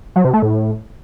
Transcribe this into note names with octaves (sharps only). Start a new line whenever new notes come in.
F#3
C3
A3
A2